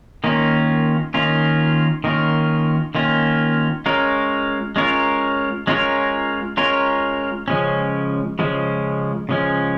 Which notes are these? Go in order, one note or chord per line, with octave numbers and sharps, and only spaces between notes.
D#3 A#3 C#4 F4
D#3 A#3 C#4 F4
D#3 A#3 C#4 F4
D#3 A#3 C#4 F4
G#3 C#4 F4 A#4 C#5
G#3 C#4 F4 A#4 C#5
G#3 C#4 F4 A#4 C#5
G#3 C#4 F4 A#4 C#5
C#3 F3 G#3 C#4
C#3 F3 G#3 C#4
C#3 F3 G#3 C#4